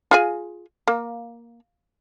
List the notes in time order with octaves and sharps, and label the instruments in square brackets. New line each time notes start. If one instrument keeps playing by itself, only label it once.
[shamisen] F4 G#4 G#5
A#3